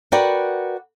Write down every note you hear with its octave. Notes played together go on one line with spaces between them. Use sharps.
F#4 A#4 B4 D5 F#5 G5